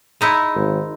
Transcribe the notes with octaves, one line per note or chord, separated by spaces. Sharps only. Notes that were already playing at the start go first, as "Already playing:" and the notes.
G#3 D#4 E4
G#1